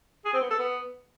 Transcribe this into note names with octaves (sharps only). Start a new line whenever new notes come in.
G#4
C4
B3
A4
B3